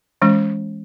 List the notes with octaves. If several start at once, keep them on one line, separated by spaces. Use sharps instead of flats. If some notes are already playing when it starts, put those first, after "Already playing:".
E3 G#3 C#4